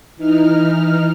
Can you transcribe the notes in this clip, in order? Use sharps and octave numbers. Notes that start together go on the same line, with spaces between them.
E3 D#4 F6